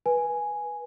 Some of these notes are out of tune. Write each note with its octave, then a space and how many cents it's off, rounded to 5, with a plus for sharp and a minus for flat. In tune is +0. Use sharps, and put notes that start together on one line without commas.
B4 -15 G#5 +0